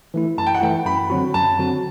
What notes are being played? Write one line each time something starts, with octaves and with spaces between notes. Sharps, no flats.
E3 A3 E4
F#2 A5
G5
F#5
E3 A3 E4 G5
F#2 B5
D3 F#3 C4 F#4
F#2 A5
D3 F#3 C4 F#4